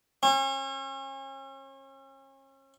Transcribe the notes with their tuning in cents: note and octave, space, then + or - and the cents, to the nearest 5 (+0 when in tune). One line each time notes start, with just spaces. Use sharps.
C#4 -40